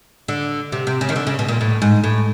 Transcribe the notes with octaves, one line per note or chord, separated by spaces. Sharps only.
D3
C3
C3
C#3
D#3
D3
C#3
B2
A#2
A2
G#2
A2